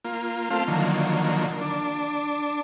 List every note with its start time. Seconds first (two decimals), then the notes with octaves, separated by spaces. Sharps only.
0.05 A#3 F4
0.51 A3 C4 F4 F5
0.68 D3 D#3 F3 F#3 A#3
1.61 D4